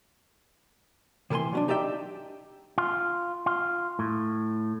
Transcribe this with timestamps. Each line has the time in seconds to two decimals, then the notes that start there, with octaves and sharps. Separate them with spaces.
1.30 C3 E3 A4 B4 G#5 C6
1.53 F#3 C#4 D4
1.68 D#4 G4 D5 E5 G5
2.78 F4
3.46 F4
3.99 A2